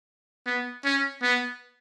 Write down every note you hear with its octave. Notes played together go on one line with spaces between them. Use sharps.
B3
C#4
B3